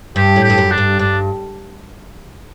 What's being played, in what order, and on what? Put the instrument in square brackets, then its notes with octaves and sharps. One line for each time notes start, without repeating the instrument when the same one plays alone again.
[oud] G2 [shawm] G4
[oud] A2
[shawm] G4
[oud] G2
F#2
[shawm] D4
[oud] G2
[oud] G2 [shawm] D4